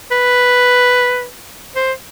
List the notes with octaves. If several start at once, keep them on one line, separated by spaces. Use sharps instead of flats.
B4
C5